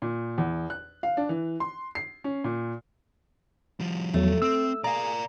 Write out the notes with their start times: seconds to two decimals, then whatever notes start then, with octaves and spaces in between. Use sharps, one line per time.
0.02 A#2
0.38 E2
0.70 F#6
1.03 F5
1.17 D4
1.29 E3
1.60 C6
1.95 C7
2.24 C#4
2.44 A#2
3.80 F3 G3
4.14 E2 F#3 A3
4.42 C4 E6
4.84 G#4 A#4 D5 F5 G#5 A#5